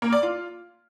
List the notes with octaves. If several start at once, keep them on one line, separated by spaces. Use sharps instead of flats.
A#3
D5
F4